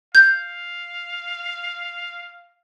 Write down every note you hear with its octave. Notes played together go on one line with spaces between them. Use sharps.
F5 G6